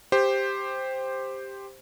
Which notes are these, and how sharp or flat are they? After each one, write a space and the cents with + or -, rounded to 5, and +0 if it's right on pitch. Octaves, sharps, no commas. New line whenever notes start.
G4 +10 C5 +0